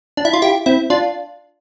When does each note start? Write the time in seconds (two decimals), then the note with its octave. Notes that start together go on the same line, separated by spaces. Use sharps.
0.17 D4
0.25 E4
0.33 F4
0.42 E4 G4
0.66 C4 E4
0.90 D4 F4